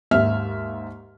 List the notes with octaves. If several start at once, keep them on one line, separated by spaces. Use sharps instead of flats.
D#2 G#2 E5 F6